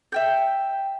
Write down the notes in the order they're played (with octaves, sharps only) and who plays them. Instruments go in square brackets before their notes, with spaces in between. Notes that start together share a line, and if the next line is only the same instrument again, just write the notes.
[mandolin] E5 G5 G6